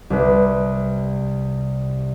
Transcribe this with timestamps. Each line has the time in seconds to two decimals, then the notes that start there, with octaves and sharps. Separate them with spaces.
0.10 C2 B4